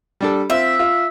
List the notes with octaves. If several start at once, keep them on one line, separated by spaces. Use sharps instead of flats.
G3 D4 A4
C4 F4 E5
F4